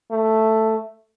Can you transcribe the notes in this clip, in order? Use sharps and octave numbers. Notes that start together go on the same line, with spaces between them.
A3